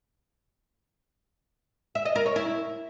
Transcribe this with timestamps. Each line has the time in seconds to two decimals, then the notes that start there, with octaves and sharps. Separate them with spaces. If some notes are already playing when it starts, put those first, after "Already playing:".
1.95 E5
2.05 D#5
2.16 A#4
2.26 C#5
2.36 E4